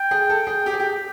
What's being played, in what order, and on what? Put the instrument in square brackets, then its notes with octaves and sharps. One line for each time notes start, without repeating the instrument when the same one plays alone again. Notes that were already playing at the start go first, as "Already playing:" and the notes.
Already playing: [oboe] G5
[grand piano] G#4
A4
G#4
G4
G#4
G4